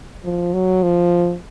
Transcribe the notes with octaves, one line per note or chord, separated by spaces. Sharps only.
F3
F#3
F3